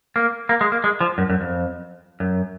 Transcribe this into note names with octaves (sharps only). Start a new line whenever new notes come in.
A#3
A#3
G#3
A#3
G#3
F3
F#2
F#2
F2
F#2